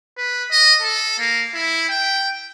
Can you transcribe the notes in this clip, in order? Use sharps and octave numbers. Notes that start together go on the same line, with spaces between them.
B4
D#5
A4
A#3
E4
G5